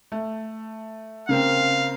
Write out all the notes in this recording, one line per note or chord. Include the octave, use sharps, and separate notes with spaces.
A3
C#3 A#3 C4 F5